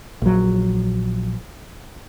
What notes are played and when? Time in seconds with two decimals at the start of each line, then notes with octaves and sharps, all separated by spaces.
0.22 A#1 F#3